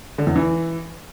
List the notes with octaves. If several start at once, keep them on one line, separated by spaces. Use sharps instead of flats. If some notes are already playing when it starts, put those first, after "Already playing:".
D3
E2
E3